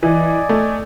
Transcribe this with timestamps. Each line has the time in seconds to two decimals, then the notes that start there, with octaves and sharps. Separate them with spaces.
0.03 E3 D5 D#5 G#5
0.49 A3